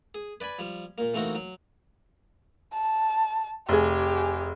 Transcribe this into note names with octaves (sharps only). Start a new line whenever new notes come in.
G#4
B4 D5 G#5 B5
F3 G3
A#2 A#3
E3 A3 A#3 C4 D#4 F#4
F#3
A5
F1 G4 G#4